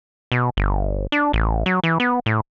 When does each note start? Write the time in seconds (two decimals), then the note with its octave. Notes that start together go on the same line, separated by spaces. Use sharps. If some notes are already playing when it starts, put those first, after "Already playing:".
0.32 B2
0.57 G1
1.12 D4
1.33 A1
1.66 F#3
1.84 E3
2.00 B3
2.26 A2